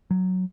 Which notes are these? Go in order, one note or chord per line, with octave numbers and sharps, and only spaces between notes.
F#3